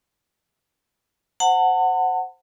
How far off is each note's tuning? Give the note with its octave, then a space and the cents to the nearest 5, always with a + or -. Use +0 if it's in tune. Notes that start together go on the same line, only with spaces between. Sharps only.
C5 +0 F#5 +0 A5 +40